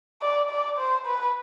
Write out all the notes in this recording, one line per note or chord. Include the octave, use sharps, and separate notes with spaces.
D5
D5
C5
B4